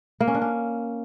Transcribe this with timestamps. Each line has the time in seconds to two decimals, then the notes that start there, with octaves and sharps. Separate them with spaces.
0.20 A#3
0.27 C#4
0.35 D4
0.42 C#4